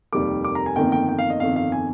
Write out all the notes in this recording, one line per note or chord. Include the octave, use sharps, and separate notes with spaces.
F1 D#2 D#3 G3 A#3 D6
D6
A#5
G#5
G1 F2 D#3 A#3 G5
G5
G5
F5
D#5
G1 F2 D#3 F5
F5
G#5